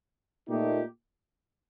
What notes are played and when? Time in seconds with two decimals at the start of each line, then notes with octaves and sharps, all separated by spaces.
0.49 A#2 A3 D#4 G4